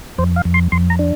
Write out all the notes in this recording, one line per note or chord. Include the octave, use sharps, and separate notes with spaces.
F2 C5
F5
F2
C6
F2 C6
A#5
D4